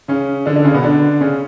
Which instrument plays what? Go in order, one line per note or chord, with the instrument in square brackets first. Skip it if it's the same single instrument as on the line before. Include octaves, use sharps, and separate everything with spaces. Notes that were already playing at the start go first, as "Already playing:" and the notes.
[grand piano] C#3 C#4
D3 D4
D3 D4
C#3 C#4
B2 B3
D3 D4
C#3 C#4